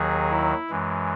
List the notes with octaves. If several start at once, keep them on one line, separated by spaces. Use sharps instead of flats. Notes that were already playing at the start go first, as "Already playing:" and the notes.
Already playing: D#2 D#3 F#3 G#4
E4
F#2 E3 G#3